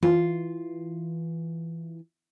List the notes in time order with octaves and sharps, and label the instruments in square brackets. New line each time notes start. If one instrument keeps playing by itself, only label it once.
[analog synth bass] E3 [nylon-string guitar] F4